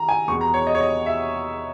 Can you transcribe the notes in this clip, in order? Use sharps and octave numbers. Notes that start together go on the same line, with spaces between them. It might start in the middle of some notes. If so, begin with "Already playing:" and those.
Already playing: D#3 A#5
G#5
E2 B2 G#3 C#6
A#5
C#5
D#5
C#5
D#5
E5